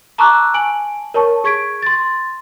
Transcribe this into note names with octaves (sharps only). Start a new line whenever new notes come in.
A5 A#5 C#6 D6 E6 F#6
G#5 A5 D7 F#7
A#4 C#5 A5 C#6
G#4 C#6 G#6 B6 D7
C6 A6